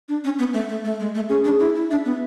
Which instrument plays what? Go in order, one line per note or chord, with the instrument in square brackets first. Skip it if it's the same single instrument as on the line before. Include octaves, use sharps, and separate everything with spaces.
[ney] D4
C#4
B3
A3
A3
A3
G#3
A3
[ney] C#4 [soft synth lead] G#4
[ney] D4
E4
E4
[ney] D4 [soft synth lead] E5
[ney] B3